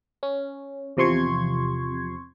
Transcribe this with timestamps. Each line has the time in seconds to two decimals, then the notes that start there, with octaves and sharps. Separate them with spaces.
0.23 C#4
0.97 E2 C3 F3 C6 C#6 G#6